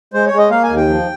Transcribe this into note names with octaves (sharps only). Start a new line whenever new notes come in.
G#3 C5
C#5
G#3
D#5
A#3 F5
G#5
D#2
G5
F3